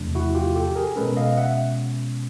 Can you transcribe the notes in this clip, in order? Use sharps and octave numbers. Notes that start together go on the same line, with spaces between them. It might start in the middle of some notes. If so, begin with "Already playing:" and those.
Already playing: E2 C3 F3 A3 D4
E4 F#4
F4 G4
G4 A4
G#4 A#4
B2 G#3 C#4 A4 B4
D#5 F5
E5 F#5